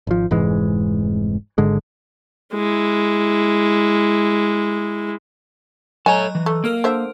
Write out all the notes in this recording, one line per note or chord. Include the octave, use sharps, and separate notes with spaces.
G#1 F3
F1 G#2 E3 G#3
G#1 G#2 D3 G#3
G#3 E4
F#3 A4 C#5 D#5 G#5 A#5
E3
A3
A#3 A#4 F6 D7
D3 C5 E5